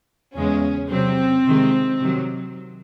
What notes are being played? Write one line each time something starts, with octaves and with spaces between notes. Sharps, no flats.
E2 C#3 G#3 C#4
C3 F#3 C4
C3 D#3 G#3
C3 D#3 F#3